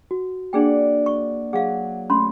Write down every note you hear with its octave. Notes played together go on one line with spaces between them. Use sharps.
F#4
A#3 D4 G#4 D5 F#5 G5
C#6
F#3 G#4 F5 F#5
A3 C#4 B5 C6